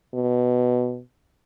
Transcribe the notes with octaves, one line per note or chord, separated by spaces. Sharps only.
B2